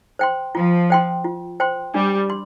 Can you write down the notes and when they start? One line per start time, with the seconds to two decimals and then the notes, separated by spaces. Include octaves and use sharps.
0.19 C5 G5 C6
0.55 F3 F4
0.90 C5 G5 C6
1.24 F4
1.60 C5 G5 C6
1.94 G3 D4
2.30 C6